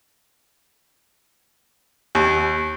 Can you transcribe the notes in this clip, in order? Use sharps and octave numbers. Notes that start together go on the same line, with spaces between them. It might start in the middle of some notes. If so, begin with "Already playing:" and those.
D#2